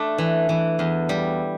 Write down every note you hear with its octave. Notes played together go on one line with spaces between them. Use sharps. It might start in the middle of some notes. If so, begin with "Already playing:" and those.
Already playing: A3 D4
E3
E3
E2
G3